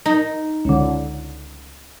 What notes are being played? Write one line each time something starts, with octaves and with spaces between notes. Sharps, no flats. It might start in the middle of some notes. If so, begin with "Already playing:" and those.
D#4
C#2 D3